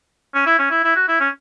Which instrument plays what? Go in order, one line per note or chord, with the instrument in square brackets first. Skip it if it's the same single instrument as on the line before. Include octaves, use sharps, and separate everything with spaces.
[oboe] C#4
E4
C#4
E4
E4
F#4
E4
C#4